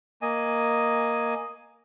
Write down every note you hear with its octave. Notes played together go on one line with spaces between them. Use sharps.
A#3 D#5 G#5